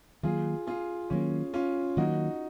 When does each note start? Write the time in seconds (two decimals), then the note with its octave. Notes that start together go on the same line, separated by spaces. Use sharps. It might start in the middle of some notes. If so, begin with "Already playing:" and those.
0.23 D#3 F#3 A#3 F4 G#4
0.67 F4 G#4
1.10 D#3 F#3 A#3 C#4
1.54 C#4 F4
1.97 D#3 F#3 A#3 D#4 F#4